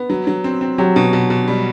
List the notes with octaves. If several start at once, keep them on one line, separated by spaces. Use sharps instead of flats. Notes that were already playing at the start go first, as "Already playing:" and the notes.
Already playing: B3
F#3
F#3
C4
C4
F#3 G4
B2
B2
B2
G3